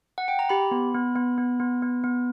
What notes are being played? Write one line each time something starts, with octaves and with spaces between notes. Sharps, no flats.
F#5
G5
A#5
G4 B5
B3
B3
B3
B3
B3
B3
B3